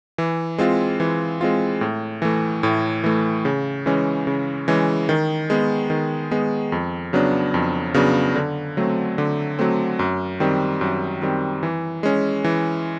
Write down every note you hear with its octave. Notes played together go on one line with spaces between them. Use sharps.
E3
G#3 C4 F4
E3
G#3 C4 F4
A2
E3 A3
A2
E3 A3
C#3
E3 G#3 C#4
C#3
E3 G#3 C#4
D#3
G#3 B3
D#3
G#3 B3
F2
C#3 F#3 B3 D4
F2
C#3 F#3 B3 D4
D3
F#3 A3 C4
D3
F#3 A3 C4
F#2
D#3 G3 C4
F#2
D#3 G3 C4
E3
G#3 C#4
E3